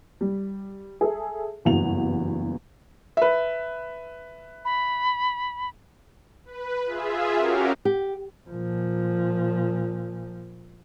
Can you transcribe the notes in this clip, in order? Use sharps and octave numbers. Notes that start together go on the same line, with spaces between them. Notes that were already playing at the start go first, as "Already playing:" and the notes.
G3
G#4 A4 E5
F#1 E2 G2 F#4 F#5 F7
B4 E5
B5
B4
F4 G#4 E5
C#4 F#4 G4 A#4 F5
G4
A#2 F3